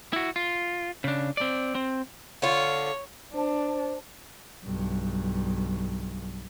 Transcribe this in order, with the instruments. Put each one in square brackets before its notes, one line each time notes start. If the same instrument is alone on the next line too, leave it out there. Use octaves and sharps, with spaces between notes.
[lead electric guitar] E4 F#4
F4
C#3 D4
C4 D5
C4
[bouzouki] D3 F4 [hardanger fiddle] C#5
[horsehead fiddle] D4 [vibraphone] C5 A5
[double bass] B1 G2